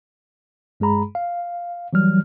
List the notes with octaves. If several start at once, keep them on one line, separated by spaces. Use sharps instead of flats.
G2 G#3 G#4 A#5 B5
F5
E3 F#3 G3 F6